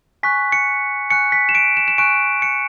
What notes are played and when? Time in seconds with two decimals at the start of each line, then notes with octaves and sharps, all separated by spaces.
0.23 G#5 C#6 F#6 B6
0.52 C#7
1.11 G#5 C#6 F#6 C#7
1.32 B6
1.49 E7
1.55 D7
1.77 E7
1.88 E7
1.98 G#5 C#6 F#6 D7
2.42 C#7